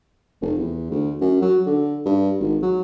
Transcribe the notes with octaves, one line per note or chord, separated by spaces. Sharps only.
F1
E2
D2
F#2
F#3
D3
G2
G#1
F#3